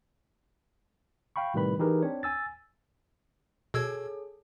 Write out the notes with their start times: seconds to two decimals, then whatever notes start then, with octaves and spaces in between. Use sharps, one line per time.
1.36 F5 G5 B5 C#6
1.54 A2 C3 D#3 G3 B4 B5
1.79 E3 D#4 G4 G#4 A#4 B4
2.02 C4 D4 C#5
2.23 G#5 E6 A6
3.74 B2 G#4 A4 C#5 E6 G#6